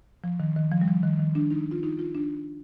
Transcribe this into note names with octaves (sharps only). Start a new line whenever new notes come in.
F3
D#3
D#3
F3
G3
F3
D#3
D#3
D4
D#4
F4
D#4
F4
D4